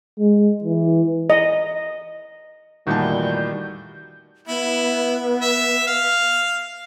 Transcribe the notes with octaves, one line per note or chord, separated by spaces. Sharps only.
G#3
E3
D#5
F1 A#2 D#3 E3 G3 F#4 A5 G6
B3 E4
E5
F5